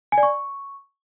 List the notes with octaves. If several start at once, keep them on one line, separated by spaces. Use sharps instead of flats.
G#5
D5
C#6